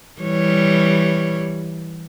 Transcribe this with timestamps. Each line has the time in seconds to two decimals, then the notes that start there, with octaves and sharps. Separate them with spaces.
0.21 E3 G3 C#5